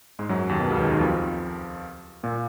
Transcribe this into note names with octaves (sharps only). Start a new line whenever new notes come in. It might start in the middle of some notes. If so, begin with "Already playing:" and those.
G#2 G#3
F#2 F#3
D#2 D#3
B2
C#2 C#3
D#2 D#3
D#2 D#3
F2 F3
A#2 A#3